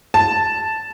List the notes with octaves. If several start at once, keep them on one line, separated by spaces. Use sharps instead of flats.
A5